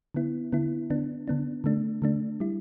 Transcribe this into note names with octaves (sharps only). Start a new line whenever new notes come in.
D3 B3 E4
D3 B3 E4
D3 B3 D4
D3 B3 D4
D3 A3 D4
D3 A3 D4
G3 E4